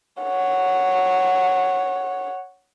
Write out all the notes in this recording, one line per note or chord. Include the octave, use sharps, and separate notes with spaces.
C#5 F#5